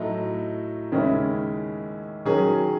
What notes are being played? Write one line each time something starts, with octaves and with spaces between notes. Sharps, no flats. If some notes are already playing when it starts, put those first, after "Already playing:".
Already playing: A2 F#3 A3 D#4
D#2 C#3 G#3 C#4 E4
D#3 F#3 C#4 G#4